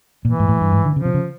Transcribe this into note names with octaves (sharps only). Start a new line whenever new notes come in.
A#2 E3
G#2
A2
G2
G#2
D3
C#3 F3
C3
C#3